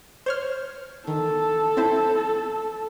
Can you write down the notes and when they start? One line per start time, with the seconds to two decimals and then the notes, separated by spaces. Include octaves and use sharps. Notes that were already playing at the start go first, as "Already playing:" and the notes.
0.26 C5 C#5 F6
1.07 D#3 A4
1.77 C4 E4 C5